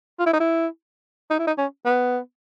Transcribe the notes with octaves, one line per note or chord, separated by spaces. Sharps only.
F4
E4
D#4
E4
D#4
E4
D#4
C#4
B3